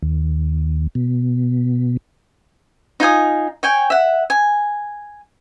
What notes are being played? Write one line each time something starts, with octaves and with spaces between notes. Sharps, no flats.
D#2
B2
D#4 F4 G#5 D#6
C#5 G5 G#5
E5 F#5
G#5